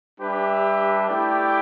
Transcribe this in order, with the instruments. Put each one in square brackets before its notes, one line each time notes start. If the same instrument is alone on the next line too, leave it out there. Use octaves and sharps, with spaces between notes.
[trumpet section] G3 D4 G4 B4 E5
A3 E4 G4 D5 G5